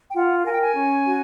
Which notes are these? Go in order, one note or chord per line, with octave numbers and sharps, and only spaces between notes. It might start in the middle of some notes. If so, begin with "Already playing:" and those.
G5
F4 F#5
A#4 G#5
G5
G#5
C#4
F#4